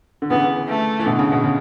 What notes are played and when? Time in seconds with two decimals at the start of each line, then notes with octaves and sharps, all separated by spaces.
0.22 D3
0.30 C#3 E3 B3
0.68 A3
0.99 E3
1.06 B2 D3
1.19 C#3
1.32 B2
1.44 C#3